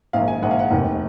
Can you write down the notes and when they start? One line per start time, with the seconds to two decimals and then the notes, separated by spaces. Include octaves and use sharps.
0.13 A#1 G#2 D#3 F5
0.28 G#5
0.42 A#1 G#2 D#3 F#5
0.51 F5
0.59 F#5
0.71 F1 D#2 D#3